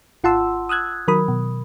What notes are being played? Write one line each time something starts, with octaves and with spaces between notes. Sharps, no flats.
G#1 F4 F#5 A5 C6 E6
D#6 E6 F#6 G#6
D#3 F#3 A#4 B5 D#6
B2